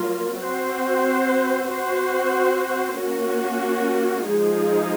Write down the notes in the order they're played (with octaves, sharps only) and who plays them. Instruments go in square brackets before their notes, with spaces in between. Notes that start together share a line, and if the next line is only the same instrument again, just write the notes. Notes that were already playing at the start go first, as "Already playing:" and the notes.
Already playing: [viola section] F#3 A#3 F4 A#4
C4 F#4 C5
C4 F#4 C5
A#3 C#4 F#4
F3 G#3 D#4 G#4